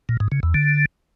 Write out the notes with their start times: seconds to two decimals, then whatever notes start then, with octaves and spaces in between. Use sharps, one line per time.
0.09 A#2
0.20 G#2
0.32 C#3
0.43 E2
0.54 D3